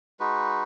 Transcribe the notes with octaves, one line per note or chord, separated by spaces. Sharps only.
G#3 D#4 F#4 B4